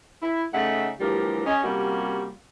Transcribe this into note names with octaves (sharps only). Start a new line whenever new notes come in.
E4
C#3 A3 D#4 E5 F#5
D2 E3 F3 G3 G4 A#4
C#4 G#4 D#5
C3 G3 A#3 C#4 F4 F#4